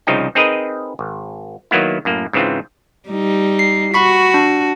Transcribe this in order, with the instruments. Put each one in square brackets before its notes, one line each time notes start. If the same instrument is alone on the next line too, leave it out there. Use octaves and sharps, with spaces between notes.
[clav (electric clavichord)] C2 C#3 F3 D#4 G5
C4 D#4 G#4 A#4 B4 D#5
G#1
D#3 F#3 A#3 B3 E4
F#2 A2 A#3
G#2 C#3 E3 C4 F4
[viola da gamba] G3 D#4
[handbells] C7
[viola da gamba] F#4 [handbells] B5 C#6 B6
[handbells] D4